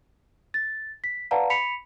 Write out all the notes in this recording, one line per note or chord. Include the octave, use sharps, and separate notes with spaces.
A6
B6
B4 D5 F5 F#5 A5 A#5
B5 B6 C#7 F7